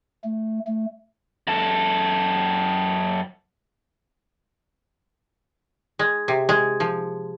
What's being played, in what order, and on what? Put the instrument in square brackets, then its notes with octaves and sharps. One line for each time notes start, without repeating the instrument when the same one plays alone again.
[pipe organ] A3
A3
[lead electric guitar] F#2 A4
[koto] G#3
C3
G#3
F3